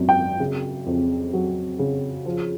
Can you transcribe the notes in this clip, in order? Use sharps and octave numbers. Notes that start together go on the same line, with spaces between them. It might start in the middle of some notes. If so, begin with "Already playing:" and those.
Already playing: G#1 F#2
G5
C#3
F2
F#3
C#3
F3